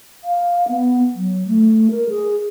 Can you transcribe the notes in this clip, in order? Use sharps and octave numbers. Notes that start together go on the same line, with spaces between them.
F5
B3
F#3
A3
A#4
G#4